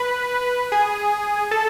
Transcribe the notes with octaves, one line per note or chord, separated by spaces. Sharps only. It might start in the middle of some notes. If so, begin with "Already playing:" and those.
Already playing: B4
G#4
A4